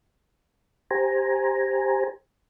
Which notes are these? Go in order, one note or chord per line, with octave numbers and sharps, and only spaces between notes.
G4 C5 G#5 A#5